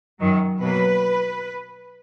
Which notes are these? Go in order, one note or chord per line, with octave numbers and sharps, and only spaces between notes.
F#2 D#3 F#3
B2 F#3 A#3 B4